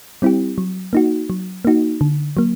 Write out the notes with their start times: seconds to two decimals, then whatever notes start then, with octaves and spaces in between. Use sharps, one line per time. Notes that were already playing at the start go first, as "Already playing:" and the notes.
0.22 G3 C4 E4 G4
0.58 F#3
0.93 A#3 D#4 F#4
1.30 F#3
1.65 A#3 D#4 F#4
2.01 D3
2.37 F#3 A#3